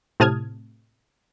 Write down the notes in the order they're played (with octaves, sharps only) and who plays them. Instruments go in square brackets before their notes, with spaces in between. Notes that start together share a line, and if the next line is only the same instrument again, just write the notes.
[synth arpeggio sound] A2 C3 A5 D#6 F6 G#6